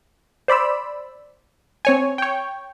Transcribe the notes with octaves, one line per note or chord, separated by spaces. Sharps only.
C5 D5 B5 E6
C4 C#5 G#5
C#5 G5